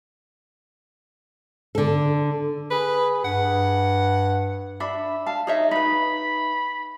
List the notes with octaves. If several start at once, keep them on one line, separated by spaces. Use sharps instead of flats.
D3 A4
G#4 B4
G2 F#5
D4 E5 B5
F5 A5
D#4 G#4 C#5 E5
D#4 B4 B5